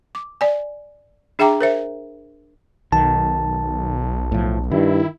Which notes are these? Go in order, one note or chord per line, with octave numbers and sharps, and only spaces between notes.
D6
D5 G#5
D4 G#4 E5 G5 A#5 D6
A#4 C5 E5
B1 D#3 A5
A2 F3
G2 D#3 E4